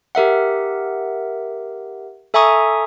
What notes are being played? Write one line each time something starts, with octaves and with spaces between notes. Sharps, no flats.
G4 A#4 E5 F#5
A4 E5 G#5 A#5 C#6 D#6